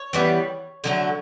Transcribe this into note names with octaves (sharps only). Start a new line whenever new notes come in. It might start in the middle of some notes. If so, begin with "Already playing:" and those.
Already playing: C#5
E3 G3 B3
D3 F#3 A3